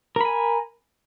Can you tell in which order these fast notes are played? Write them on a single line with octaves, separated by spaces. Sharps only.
A#4 B5 G#5